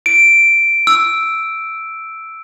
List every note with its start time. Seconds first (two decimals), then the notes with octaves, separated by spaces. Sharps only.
0.06 D7
0.87 E6